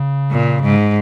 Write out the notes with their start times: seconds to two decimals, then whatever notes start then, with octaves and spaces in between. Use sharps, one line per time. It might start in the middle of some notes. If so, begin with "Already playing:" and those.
Already playing: C#3
0.32 A#2
0.63 G#2